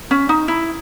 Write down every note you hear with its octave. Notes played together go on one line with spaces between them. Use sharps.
C#4
D#4
E4